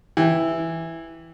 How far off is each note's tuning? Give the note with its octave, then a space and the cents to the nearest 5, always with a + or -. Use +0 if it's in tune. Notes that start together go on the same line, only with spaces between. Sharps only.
E3 +0 G5 +0